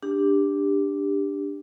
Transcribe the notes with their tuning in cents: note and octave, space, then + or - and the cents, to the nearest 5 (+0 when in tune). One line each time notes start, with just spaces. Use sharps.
D4 +0 G4 +15